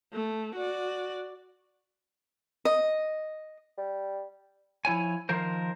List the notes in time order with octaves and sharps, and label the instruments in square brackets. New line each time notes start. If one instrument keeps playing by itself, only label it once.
[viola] A3
F#4 D5
[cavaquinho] D#5
[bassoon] G3
[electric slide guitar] F3 E4 C#5 G#5
D#3 F3 A#4 C5